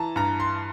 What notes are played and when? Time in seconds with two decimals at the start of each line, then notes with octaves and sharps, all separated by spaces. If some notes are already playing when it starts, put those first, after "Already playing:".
Already playing: E3 A5 A#5
0.16 G2 A#5
0.40 C6